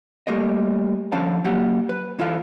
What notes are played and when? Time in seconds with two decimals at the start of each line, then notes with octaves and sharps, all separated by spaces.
0.27 G3 A3 A#3 D#5
1.12 D3 F3 C#4 F5 A5
1.44 F#3 A#3 G4 F#5
1.89 B4
2.19 E3 E4 F4 A4 F5